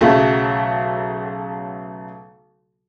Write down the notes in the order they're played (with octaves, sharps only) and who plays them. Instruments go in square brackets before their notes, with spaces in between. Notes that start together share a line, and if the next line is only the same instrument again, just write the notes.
[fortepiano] B1 C#3 F#3 A3